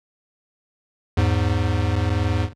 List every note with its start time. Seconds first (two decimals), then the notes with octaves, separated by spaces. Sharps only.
1.17 E2 G#2